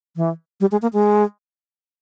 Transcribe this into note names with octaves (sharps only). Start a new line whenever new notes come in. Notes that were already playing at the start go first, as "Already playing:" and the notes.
E3
G3
G#3
A#3
G#3